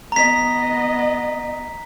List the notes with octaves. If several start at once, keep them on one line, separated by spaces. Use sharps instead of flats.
B3 D#5 A#5 B6